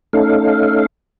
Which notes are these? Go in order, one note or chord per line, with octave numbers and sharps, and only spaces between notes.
A3 C#4 D#4 A4 F5